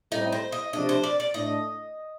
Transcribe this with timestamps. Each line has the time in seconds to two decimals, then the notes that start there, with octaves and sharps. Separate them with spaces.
0.12 A2 G3 C4 D#4
0.32 C5
0.52 D#5
0.73 C3 F3 A3 D4 D#5
0.89 C5
1.04 D5
1.20 D5
1.34 A2 A3 D4 D#5